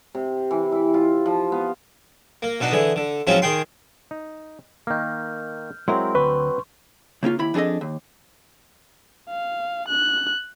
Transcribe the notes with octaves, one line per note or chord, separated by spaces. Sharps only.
C3
E3
E4
F4
F3
B3
A#3
B2 B3 D4 D#4
D3 E3 G#4
D3
G#2 F3 F#3 C4 C#4 F4
D#3 G#4 G5 C6
D#4
D#3 A#3 F6 G6
F#3 G#3 C4 E4 A#4 C6
D2 B4 C#6
C#3 A#3 C#4 F4
D#2 E4 B5
F2 D4 G#4 A4 D#5
D#2
F5
F#6